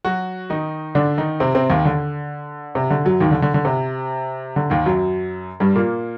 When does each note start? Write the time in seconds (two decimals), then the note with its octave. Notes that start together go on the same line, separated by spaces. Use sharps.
0.05 F#3 F#4
0.50 D#3 D#4
0.95 D3 D4
1.18 D#3 D#4
1.40 C3 C4
1.55 C3 C4
1.70 D#2 D#3
1.85 D3
2.75 C3
2.90 D3
3.05 F#2 F#3
3.20 D#2 D#3
3.31 D3
3.42 D3
3.54 D3
3.65 C3
4.56 D3
4.70 D#2 D#3
4.86 F#2 F#3
5.60 G2 G3
5.75 A#2 A#3